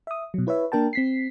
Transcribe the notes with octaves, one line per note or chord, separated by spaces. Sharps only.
E5 D#6
B2 F#3
E4 B4 C#5 E5
A#3 D4 A#4 G5 A5
C4 B6 C7